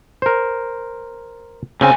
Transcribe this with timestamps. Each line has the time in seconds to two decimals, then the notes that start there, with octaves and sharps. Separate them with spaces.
0.22 A#4 C5
1.81 C2 C#3 C4 G#5